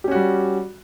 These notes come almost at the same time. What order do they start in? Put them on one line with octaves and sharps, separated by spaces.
G4 C#4 F#4 G3